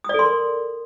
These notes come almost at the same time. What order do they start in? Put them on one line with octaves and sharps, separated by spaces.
D#6 D5 A4 C6 A#4